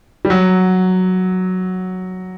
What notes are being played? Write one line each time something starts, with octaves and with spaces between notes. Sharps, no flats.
G3
F#3